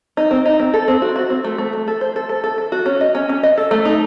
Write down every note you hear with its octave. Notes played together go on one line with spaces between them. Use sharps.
D#4
C4
D#4
C4
A4
C4
F#4
F#4
C4
A3
A3
A3
A4
C5
A4
A4
A4
A4
F#4
C#4
D#5
C#4
C#4
D#5
A4
A3
D#4